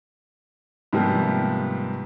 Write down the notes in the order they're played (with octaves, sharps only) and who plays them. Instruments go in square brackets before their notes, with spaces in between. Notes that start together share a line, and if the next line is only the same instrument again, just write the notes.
[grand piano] G#2 C3 F3 G3 A#3 B3